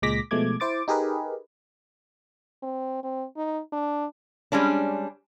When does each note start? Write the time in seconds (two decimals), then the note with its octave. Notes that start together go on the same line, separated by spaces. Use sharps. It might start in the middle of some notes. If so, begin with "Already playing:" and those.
0.02 C#2 A#2 G#3 D6 A#6 B6
0.31 B2 F3 G#3 A3 D6 G#6
0.60 E4 C5 D6 A6
0.88 D#4 G4 G#4 A#4 B4
2.63 C4
3.03 C4
3.37 D#4
3.73 D4
4.52 G3 G#3 C#4 D4